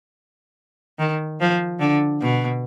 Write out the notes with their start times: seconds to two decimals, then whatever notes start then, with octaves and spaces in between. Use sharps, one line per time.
0.99 D#3
1.41 F3
1.80 D3
2.22 B2